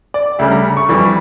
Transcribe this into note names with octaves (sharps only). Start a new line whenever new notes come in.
D5
D2 C#3 G3 E5
A#5
C#6
F2 E3 G3